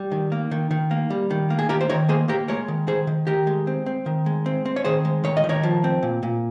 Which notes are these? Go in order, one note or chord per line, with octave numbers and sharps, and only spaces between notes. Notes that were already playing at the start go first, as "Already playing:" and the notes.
Already playing: G3
D#3
A#3
D#3
D#3
A#3
G3
D#3
A#3
G#4
D#3 G4 A#4
C5
D#3 A#4 C#5
A#3 G#4 C5
A#3 G4 A#4
G#3 A#4 C#5
D#3
D#3 G#4 C5
D#3
D#3 G4 A#4
G#3
C4
C4
D#3
G#3
C4
C4
C#5
D#3 G#4 C5
G#3
D#3 C#5
D#5
D#3
A#4 C#5
F3
C4
A#2
A#2